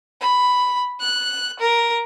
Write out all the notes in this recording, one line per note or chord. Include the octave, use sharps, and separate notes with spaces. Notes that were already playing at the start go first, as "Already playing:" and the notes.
B5
F#6
A#4